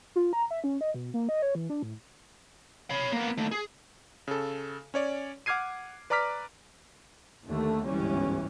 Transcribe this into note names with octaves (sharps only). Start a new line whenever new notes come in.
F4
A#5
E5
C#4
D#5
B2
A#3
D#5
C#5
E3
D4
A2
C#5 B5
A#3 B3
D#2 A3
G#4
C#3 A4
C#4 C#5 D5
F#5 D6 F6 G#6 C7 D#7
B4 D5 A#5 D6 F6 B6
D#2 D3 A3
G1 C#2 G#2 E3 G3 C#4